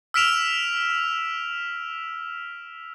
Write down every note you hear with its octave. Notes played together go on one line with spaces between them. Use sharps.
E6 F6 B6 D7 E7 F7